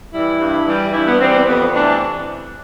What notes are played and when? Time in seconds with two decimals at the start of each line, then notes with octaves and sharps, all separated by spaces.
0.12 E3 G3 E4
0.39 G2
0.66 E3 G3
0.93 G2 E4
1.07 B3
1.21 E3 G3 C4
1.33 C4
1.47 F2 B3
1.75 C3 E3 A3 D4